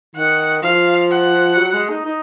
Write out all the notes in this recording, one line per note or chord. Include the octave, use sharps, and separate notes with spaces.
D#3 F#5
F3 F5
F#5
F#3
G#3
D#4
D#4